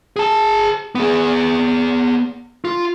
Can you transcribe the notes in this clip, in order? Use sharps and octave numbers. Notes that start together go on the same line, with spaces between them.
G#4 A5
B3 G#4
F4